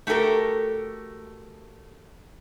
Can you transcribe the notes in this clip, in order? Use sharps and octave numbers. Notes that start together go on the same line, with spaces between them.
A3 F#4 G4 A4 A#4